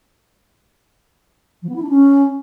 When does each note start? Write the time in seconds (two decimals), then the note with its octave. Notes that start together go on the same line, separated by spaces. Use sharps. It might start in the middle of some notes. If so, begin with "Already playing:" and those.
1.63 F3
1.69 B3
1.76 E4
1.82 D4
1.89 C#4